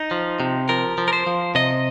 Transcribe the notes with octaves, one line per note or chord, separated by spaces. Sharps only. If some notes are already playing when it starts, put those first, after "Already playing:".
Already playing: D#4
F3
C3
F3 A#4
F3
A#4
C5
F3
C3 D#5